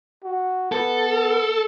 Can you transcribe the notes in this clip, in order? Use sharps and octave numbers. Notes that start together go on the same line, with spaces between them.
F#4
B3 A4